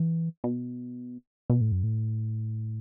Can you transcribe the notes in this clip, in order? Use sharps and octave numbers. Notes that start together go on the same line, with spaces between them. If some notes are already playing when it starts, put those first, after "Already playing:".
Already playing: E3
B2
B2
A2
F#2
A2